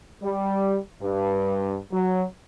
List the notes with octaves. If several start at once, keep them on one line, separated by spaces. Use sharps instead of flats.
G3
G2
F#3